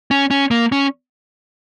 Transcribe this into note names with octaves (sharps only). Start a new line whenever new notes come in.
C#4
C#4
A#3
C#4